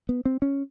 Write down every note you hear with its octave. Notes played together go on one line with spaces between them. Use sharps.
B3
C4
C#4